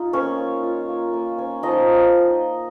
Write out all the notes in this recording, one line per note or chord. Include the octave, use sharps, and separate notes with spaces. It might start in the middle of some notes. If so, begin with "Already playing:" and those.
Already playing: D#4 F4
A#3 C#4 C#5
C#4
F4
A#3
A#3
C#4
F3 D#4 D#5